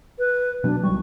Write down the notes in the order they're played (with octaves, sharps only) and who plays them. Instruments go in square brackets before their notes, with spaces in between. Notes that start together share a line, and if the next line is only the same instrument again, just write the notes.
[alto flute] B4
[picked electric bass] B2 F#3 [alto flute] D4
[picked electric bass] C2 F#3 G3 [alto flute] C#6